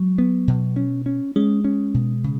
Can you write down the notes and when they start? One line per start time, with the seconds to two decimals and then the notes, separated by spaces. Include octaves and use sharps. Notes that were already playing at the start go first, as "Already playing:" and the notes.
Already playing: F#3 G#3
0.18 B3
0.48 B2
0.76 C#4
1.06 C#4
1.36 G#3 C#4
1.64 C#4
1.94 B2
2.24 C#3